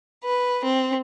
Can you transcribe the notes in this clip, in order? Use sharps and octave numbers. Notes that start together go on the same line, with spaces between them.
B4
C4